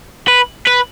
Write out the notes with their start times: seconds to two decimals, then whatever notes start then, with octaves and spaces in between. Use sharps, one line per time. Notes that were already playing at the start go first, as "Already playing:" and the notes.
0.28 B4
0.67 B4